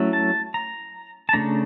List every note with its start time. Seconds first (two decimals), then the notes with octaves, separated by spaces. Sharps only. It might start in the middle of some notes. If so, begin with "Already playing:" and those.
Already playing: F#3 A3 C#4 E4
0.13 A5
0.54 A#5
1.29 A5
1.33 C#3 F3 A3 D4 A#5